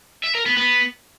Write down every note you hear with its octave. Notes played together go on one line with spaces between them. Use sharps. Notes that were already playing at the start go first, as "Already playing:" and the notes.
E5
A#4
B3
B3